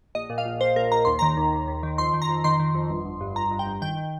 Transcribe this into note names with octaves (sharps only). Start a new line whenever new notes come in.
A#1 D#5
A#2
F5
A#1
A#2 C5
A#1 A#4
A#1 A#5
D#2 C6
D#3 A#5
D#2
D#2
D#2
D#3
F2 C6
D#3
A#5
F2
D#3 C6
D#3
F2
G1
G1
G2
G1 A#5
G2
G5
G1
D#3 G5
D#3